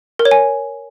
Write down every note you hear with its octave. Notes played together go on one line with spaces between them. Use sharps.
A#4
C#5
G#5